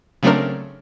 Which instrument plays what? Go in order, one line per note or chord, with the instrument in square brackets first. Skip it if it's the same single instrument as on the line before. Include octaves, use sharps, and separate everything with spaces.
[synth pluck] C#3 F#3 A3 C4 D4 A#4